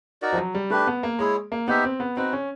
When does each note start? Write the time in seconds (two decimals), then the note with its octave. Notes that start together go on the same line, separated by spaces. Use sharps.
0.22 D#4 F#4 A#4 D5
0.33 F3
0.38 F#3
0.55 G3
0.70 A3 D4 G4 B4
0.87 B3
1.03 A#3
1.19 G#3 E4 G#4 C#5
1.52 A#3
1.68 B3 D#4 G4 C5 E5
1.84 C4
2.00 B3
2.16 C4 D#4 F#4 B4
2.33 C#4